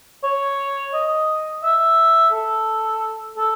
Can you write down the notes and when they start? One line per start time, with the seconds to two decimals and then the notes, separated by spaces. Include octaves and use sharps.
0.24 C#5
0.94 D#5
1.63 E5
2.32 A4
3.37 A4